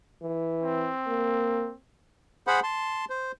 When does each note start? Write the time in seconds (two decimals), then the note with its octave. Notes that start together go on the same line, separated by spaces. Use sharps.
0.22 E3
0.62 C4
1.07 A#3
2.47 G#4 C5 F#5 B5
2.63 A5 C6
3.10 C5